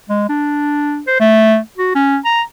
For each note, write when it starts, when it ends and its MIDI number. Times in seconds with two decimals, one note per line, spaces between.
0.09 0.24 56
0.29 1.01 62
1.07 1.16 72
1.20 1.57 57
1.78 1.91 66
1.95 2.17 61
2.25 2.42 82